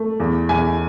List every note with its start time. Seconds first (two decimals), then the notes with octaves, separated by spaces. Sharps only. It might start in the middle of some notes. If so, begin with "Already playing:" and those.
Already playing: A3
0.20 E2
0.49 E2 G#5